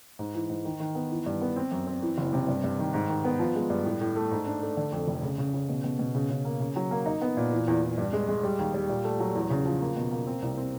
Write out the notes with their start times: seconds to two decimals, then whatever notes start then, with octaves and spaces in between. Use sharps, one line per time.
0.19 G#2
0.34 E3
0.49 G#2
0.65 D#3
0.80 D#3
0.95 B3
1.11 E3
1.26 G2
1.42 B3
1.56 C4
1.71 F#2
1.87 C4
2.02 E3
2.18 F#1
2.33 C3
2.48 G2
2.64 G2
2.79 D#3
2.94 G#2
3.09 D#3
3.24 B3
3.39 F3
3.55 G#3
3.70 G2
3.85 A2
4.01 A2
4.16 A3
4.31 G#2
4.47 D4
4.62 A3
4.77 D3
4.92 F2
5.08 F1
5.23 C#3
5.38 C#3
5.53 C#3
5.69 B2
5.84 B2
5.99 B2
6.15 C#3
6.30 C#3
6.45 A#3
6.60 C#3
6.76 F#3
6.91 A#3
7.06 D#4
7.21 B3
7.37 A#2
7.52 E3
7.68 E2
7.82 E2
7.98 G2
8.13 G#3
8.28 G#3
8.43 G3
8.59 D#2
8.74 G3
8.89 A#2
9.04 A3
9.20 F#3
9.35 E2
9.50 C#3
9.66 F3
9.81 A#3
9.96 B2
10.11 A#3
10.27 C4
10.42 C2
10.57 C4